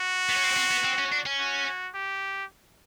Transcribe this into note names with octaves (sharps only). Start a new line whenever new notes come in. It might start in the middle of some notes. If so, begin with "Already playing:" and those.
Already playing: F#4
B3
C#4
C4
C4
B3
C4
C#4
D4
C#4
F#4
G4